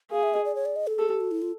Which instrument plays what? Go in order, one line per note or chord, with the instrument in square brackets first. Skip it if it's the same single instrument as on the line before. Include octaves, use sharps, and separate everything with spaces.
[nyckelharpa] G#4 [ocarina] F5
[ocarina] E5
D#5
D5
C#5
D5
D#5
A4
[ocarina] G#4 [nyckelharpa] A4
[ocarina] G4
F#4
E4
F4